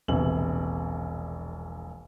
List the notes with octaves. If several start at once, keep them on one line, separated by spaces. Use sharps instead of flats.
E1 A#1 C3 F#7